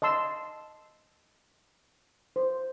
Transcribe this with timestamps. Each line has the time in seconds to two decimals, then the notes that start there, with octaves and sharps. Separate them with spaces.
0.02 D#5 A5 C6 E6
2.36 C5